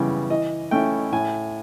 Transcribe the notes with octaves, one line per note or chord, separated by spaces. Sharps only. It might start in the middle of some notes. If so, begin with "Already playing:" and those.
Already playing: F#2 C#3 E3 G3 B3
E3 D#5
A3 C#4 E4 G5
A2 G#5